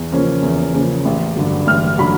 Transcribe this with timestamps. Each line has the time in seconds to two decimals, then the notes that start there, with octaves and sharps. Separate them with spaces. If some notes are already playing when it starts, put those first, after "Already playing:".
Already playing: E2
0.12 C#3 F3 A#3 C#4
0.42 E2
0.74 C#3 F3 A#3 C#4
1.05 A1
1.36 G2 D3 F#3
1.67 A1 F6
1.98 D3 F#3 B5